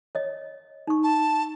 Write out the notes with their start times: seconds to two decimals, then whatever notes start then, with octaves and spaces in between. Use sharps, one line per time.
0.15 C#5 D#5
0.87 D#4 C#6
1.03 A5